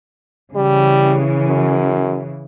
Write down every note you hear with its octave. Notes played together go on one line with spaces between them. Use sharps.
C#3 E3 G3
F#2